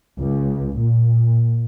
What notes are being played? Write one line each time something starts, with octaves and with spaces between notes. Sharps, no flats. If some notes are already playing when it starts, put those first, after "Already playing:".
C#2
A#2